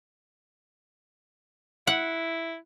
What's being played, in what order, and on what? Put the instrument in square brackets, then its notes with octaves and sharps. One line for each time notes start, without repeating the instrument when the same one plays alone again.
[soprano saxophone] E4 [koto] F#5